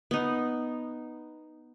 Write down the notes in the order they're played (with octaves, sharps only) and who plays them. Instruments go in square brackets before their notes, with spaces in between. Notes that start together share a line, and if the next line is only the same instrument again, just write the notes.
[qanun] B3 D#4